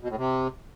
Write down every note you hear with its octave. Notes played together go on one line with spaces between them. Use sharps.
B2
A2
C3